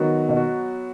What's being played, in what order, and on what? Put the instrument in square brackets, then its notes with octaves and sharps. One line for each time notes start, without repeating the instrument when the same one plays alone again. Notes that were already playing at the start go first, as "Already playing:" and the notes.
Already playing: [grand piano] D#3 [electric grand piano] F#3 B3 F#4
[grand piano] B2
[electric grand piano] F#4